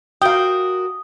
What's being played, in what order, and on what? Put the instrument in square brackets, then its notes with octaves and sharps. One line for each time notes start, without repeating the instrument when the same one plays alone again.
[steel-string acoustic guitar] F#4 A#4 [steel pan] F5 G5 [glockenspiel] D#6 G7